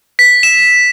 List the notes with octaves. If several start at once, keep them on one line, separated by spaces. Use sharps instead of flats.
B6
E7